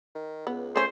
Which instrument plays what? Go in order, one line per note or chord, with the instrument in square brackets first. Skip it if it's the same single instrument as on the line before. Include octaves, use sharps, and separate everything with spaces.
[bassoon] D#3
[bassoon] C#2 [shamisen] B3
[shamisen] A3 C#4 [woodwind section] C5